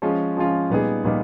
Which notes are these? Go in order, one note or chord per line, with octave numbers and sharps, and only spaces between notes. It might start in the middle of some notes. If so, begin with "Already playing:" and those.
F3 G#3 C#4 F4
F3 G#3 C#4 F4
A#2 G3 B3 D#4 G#4
A#2 G3 B3 D#4